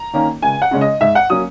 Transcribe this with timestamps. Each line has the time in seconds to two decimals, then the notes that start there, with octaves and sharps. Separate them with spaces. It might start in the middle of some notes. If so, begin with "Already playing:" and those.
Already playing: A#5
0.14 D#3 A#3 C#4
0.42 C#2 G#5
0.62 F#5
0.71 C#3 G#3 C#4
0.81 D#5
1.01 G#2 E5
1.15 F#5
1.30 F#3 A#3 C#4 D#6